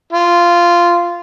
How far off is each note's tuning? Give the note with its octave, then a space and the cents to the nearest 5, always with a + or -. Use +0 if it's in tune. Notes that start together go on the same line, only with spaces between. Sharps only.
F4 -10